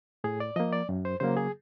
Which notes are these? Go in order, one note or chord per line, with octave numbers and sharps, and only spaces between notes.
A2 G#4
D5
F3 A#3 D#5
D5
F#2
C5
C#3 F#3 A#3 C5
G#4